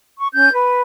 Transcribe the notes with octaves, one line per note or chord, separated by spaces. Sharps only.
C#6
C#4 G6
B4